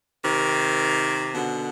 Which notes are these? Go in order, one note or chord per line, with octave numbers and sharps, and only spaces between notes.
C3 D#3
B2 D3